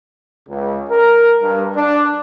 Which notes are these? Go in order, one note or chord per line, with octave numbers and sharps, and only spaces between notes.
C#2
A#4
G2
D4